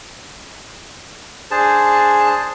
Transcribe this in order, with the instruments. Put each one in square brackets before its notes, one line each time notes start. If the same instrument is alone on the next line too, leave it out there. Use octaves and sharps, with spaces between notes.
[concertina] D4 C5 [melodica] G#4 A5